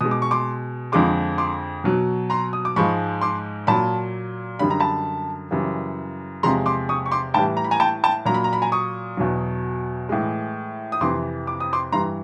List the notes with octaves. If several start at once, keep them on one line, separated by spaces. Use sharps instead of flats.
B2 G#3 D#6
D6
C#6
C6 D6
F2 D3 F3 G#3 C6 D6
C6 D6
B2 F#3
A#5 C6
D#6
D6
G#2 F3 G#3 B5 C#6
C6 D6
A#2 F#3 A5 B5
F#2 D3 G3 B5
A#5
A5 B5
F#2 C#3 E3 G3
E2 C3 F3 G#3 A#5 C6
C6 D6
C#6 D#6
C#6
C6 D6
A2 E3 G3 G5 A5
A#5
B5
G#5 A#5
G5 A5
G5 A5
A#2 F#3 A#5
B5
A#5
B5
G#5 A#5
C#6 D#6
E2 B2 F#3
A2 E3 G#3
D#6
F2 C3 E3 C6 D6
D6
D#6
C6 D6
G2 E3 G3 A#5 C6